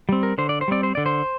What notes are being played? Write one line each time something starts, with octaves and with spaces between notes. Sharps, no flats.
G3 C4
A#4
D3 C5
D5
C5
G3 C4 D5
C5
D3 D5
C5